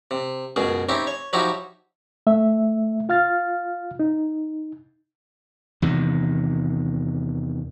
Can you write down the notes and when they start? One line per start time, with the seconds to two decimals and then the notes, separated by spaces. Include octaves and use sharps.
0.11 C3
0.56 C#2 F#2 B2 G#4
0.89 C4 C#4 D#4 E4 G4
1.07 C#5
1.33 F3 F#3 D#4 E4 F#4 G4
2.27 A3 E5
3.09 F4 F5 F6 A6
3.99 D#4
5.82 E2 C3 D#3